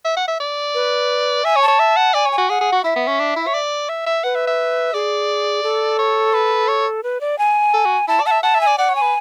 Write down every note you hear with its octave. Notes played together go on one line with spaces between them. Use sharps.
E5
F#5
E5
D5
B4
E5 G#5
C#5
A5
C#5
E5
F#5
D5 G#5
C#5
G#5
F#4
G#4 F#5
G#4
F#4
E4 E5
B3
C#4
D4
E4
C#5
D5
E5
E5
B4 F#5
E5
E5
G#4 D5
A4
C#5
B4
C#5
B4
D5
G#5
A4
F#4
E4 A5
D5
F#5 A5
E5
F#5 A5
E5
G#5
D5
D5 F#5
C#5
G#5
B4